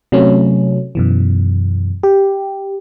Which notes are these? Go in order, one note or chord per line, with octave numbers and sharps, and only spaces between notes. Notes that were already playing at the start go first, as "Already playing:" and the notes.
C3 F#3 A3 C#4
F#2 B2 E3
G4